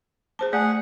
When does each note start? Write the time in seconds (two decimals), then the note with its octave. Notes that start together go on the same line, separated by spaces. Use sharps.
0.39 G#4 C5 A5
0.53 A3 G#4 D5 F#5